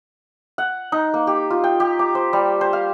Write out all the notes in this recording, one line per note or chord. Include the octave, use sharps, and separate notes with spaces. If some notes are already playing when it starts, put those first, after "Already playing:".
F#5
D#4
A#3
G4
F4
G5
G4
D6
C5
G3
C5
F5